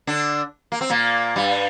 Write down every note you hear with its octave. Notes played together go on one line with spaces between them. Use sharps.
D3 D4
A#3
C4
A#2 A#3
G2 G3